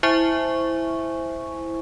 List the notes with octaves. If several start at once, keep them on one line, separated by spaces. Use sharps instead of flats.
E4 C5 E5 G#5 C#6